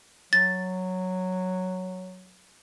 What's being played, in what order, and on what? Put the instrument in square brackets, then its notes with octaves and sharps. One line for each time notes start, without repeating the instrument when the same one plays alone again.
[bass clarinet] F#3 [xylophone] A6